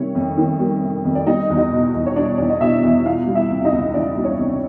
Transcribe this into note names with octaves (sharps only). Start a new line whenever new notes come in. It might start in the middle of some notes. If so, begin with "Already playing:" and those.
Already playing: C3 D#3 G3 C#4 C#5
F2
D#3
G3
C3
F2
D5
G3 D#4 D#5
E2
D#4 D#5
B2
E2
C#5
G3 D4 D5
E2 D5
D#5
B2 E4 E5
E2
E3 F4 F5
G3
E4 E5
C3
D#4 D#5
C#2
E3 D4 D5
G3
C#4 C#5
C3